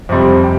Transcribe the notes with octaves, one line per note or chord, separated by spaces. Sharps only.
F2 C3 G3 C4
G4